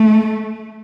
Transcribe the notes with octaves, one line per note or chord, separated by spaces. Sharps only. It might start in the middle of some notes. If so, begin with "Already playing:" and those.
Already playing: A3